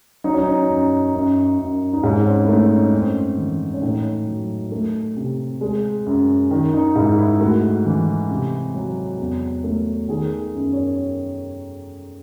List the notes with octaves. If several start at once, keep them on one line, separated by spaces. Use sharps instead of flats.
F#3 D#4
C#4
D#4
F#2
F#2
F#2
D#4
G#2 C#4
C4
C#4
E4
A3 D#4
C#4
F#2 C4
E3
C#4
A2 D#4
F#3
A3
C3
G#3
F#2
D#3
D#4
G#2 E4
E4
A3 F#4
E3
C3
F#3
E2
A3
D#3 G#4
F#2
C#5